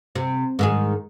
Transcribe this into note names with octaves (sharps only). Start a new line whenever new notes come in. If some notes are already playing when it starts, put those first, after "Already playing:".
C3
G#2 D#3 G#4